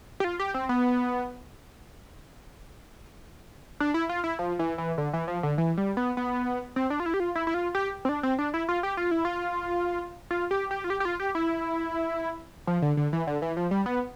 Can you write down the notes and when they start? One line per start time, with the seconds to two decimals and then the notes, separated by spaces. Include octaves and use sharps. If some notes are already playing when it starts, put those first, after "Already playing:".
0.20 G4
0.24 F4
0.40 G4
0.54 C4
0.69 B3
3.80 D4
3.94 E4
4.09 F4
4.24 E4
4.39 F3
4.59 E3
4.78 E3
4.98 D3
5.13 E3
5.28 F3
5.43 D3
5.58 E3
5.78 G3
5.97 B3
6.17 B3
6.76 C4
6.90 D4
7.00 F4
7.06 E4
7.14 G4
7.20 F4
7.35 E4
7.47 E4
7.54 F4
7.75 G4
8.05 C4
8.09 D4
8.23 C4
8.39 D4
8.54 E4
8.69 F4
8.83 G4
8.97 F4
9.11 E4
9.25 F4
10.31 F4
10.51 G4
10.71 G4
10.84 F4
10.90 G4
11.00 G4
11.05 F4
11.20 G4
11.35 E4
12.67 F3
12.82 D3
12.97 D3
13.13 E3
13.27 D3
13.42 E3
13.57 F3
13.71 G3
13.86 B3